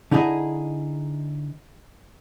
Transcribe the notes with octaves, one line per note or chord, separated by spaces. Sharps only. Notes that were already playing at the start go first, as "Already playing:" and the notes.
D3 D#4 E4 G#4 D#5